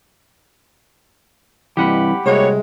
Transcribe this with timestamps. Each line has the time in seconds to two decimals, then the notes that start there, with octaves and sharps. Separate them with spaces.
1.77 G2 C3 E3 G4 F#5 B5
2.26 C2 C3 G#3 A#3 F#4 C#5